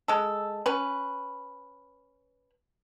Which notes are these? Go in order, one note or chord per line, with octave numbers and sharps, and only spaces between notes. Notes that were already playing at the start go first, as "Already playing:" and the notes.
G#3 A4
C#4 B4